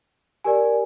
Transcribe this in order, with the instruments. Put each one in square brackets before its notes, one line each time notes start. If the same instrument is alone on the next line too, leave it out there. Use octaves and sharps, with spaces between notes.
[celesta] G4 A#4 D5 G#5